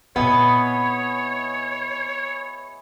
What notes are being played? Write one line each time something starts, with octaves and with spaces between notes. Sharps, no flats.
A#2 B3 C4 E4 G#4 C#5 D#5